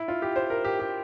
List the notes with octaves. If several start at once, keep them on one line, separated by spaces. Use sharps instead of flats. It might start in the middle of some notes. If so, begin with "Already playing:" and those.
Already playing: E4
F4
G4
C5
A#4
G4
G4